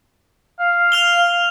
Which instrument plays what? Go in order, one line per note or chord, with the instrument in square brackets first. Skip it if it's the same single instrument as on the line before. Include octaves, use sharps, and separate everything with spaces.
[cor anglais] F5
[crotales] F6 F7 G7